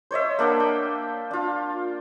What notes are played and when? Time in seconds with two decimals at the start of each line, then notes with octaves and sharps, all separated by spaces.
0.11 C5 C#5 D#5 E5
0.39 A#3 D4 F#5 G5
0.60 G5
1.31 D4 F4